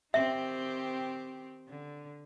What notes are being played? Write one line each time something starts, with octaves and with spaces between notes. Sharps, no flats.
D#3 C4 G4 E5
D3